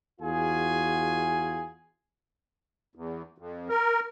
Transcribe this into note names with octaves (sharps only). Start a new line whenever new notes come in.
E2 F4 F#4 G#4 G#5
E2
F2
A#4